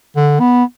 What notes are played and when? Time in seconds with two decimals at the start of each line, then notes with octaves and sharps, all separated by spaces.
0.16 D3
0.40 B3